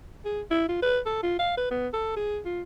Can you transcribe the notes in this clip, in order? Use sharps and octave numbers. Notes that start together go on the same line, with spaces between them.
G#4
E4
F4
B4
A4
F4
F5
B4
B3
A4
G#4
F4